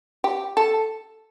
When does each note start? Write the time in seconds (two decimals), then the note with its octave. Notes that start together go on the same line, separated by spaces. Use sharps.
0.24 G4
0.57 A4